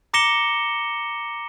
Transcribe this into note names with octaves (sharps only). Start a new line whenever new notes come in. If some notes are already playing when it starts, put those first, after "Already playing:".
A#5 D6 A#6 C#7 E7 G7